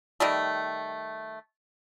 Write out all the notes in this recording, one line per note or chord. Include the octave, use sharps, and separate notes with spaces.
D#3 G3 A3